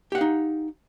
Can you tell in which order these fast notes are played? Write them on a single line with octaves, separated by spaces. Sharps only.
G4 F#5 F5 D#4